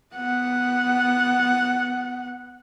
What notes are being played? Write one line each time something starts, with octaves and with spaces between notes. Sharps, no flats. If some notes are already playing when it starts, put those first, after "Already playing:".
B3 F#5